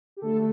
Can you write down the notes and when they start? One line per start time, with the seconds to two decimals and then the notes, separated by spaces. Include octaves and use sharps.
0.17 G4
0.21 D3 A3 A4